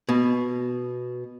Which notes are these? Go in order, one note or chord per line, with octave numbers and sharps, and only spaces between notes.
B2